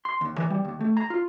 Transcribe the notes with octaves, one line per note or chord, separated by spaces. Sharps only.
C6
D#2
E3
G3
D#2
A3
A#5
F4